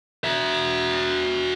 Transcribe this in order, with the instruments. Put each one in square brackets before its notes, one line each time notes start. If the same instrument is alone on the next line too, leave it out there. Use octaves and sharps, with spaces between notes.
[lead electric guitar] F#4 E5